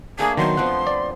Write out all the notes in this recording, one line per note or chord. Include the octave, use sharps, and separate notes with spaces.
A3 A#3 D4 G#4
B2 D#3 F#3 C6
F3 B3 C4 F#5
D5